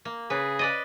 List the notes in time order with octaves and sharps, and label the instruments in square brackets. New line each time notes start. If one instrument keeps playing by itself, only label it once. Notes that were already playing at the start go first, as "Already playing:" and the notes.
[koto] A#3
[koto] C#3 B4 [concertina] G#4
[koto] B4 D5 D#5